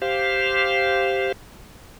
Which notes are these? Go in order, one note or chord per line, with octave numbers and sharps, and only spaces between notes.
G4 C5 F5